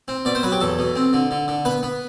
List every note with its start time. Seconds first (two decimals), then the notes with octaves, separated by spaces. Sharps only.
0.08 C4
0.25 B2 D5
0.35 C5
0.43 F#3 B4
0.52 G4
0.60 E2 A4
0.79 B2
0.96 C4
1.13 D3
1.31 D3
1.48 D3
1.65 B3 B4
1.83 B3